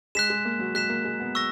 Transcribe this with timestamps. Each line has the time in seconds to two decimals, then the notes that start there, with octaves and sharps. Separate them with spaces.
0.15 G#3 F#6 B6 E7
0.30 G#3
0.45 A#3
0.59 F#3
0.74 G#3 F#6 B6 E7
0.89 A#3
1.05 G#3
1.20 B3
1.35 C#6 E6 A#6